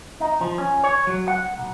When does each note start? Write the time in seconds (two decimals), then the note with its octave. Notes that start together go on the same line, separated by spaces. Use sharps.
0.20 D#4
0.41 F3
0.58 C#4
0.84 C#5
1.07 F#3
1.28 F#5
1.58 B1